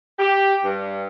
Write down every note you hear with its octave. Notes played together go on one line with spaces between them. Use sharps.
G4
G2